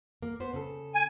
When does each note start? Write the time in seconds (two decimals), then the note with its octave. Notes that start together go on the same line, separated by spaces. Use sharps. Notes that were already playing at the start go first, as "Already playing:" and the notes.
0.22 A#3
0.40 B3 C5
0.54 C#3 A4
0.94 G#5